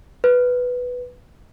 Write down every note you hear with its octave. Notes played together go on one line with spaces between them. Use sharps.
B4